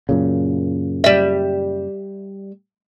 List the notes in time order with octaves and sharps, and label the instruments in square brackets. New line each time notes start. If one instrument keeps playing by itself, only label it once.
[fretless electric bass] F#2 A#2 C#3
[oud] G3 E5